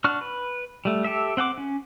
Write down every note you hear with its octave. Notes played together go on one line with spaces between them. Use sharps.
D4 F#4 C#6 F6 F#6
B4
G3 A3
G4 A4 E5
C4 F#5 G5 D6
C#4